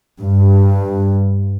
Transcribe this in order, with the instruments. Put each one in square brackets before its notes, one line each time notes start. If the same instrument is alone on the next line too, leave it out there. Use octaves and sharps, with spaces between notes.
[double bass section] G2